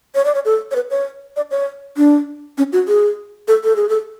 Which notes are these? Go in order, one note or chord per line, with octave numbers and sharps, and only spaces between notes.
C#5
D5
C#5
A4
C#5
B4
C#5
D5
C#5
D4
C#4
F#4
G#4
A4
A4
G#4
A4